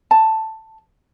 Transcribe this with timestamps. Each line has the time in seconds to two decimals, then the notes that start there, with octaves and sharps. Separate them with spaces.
0.11 A5